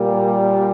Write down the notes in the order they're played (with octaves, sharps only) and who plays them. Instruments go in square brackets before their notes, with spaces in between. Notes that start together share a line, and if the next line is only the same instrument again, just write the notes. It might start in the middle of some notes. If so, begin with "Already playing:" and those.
Already playing: [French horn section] A#2 G3 A#3